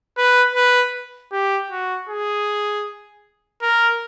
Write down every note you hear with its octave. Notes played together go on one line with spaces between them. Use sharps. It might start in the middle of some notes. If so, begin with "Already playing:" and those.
B4
B4
G4
F#4
G#4
A#4